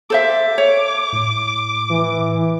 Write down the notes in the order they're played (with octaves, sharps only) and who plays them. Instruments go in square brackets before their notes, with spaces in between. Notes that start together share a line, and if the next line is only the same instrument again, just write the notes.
[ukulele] A4 C5 E5 [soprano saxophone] D6
[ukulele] C#5
[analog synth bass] A2
[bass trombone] E3